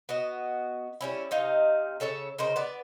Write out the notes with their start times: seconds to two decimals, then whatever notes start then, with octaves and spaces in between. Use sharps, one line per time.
0.09 B3 F#4 D#5
1.01 G3 C#4 E4
1.31 C3 D#4 F5
2.00 C#3 A4 C#5 E5
2.39 C#3 D#4 A#4 C5
2.56 B3 D5